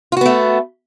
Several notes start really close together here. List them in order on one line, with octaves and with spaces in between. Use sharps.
F4 F#4 B3 A3